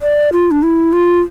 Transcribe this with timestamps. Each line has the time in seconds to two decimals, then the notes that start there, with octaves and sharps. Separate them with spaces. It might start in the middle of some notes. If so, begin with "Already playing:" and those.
0.02 D5
0.33 F4
0.51 D4
0.63 E4
0.93 F4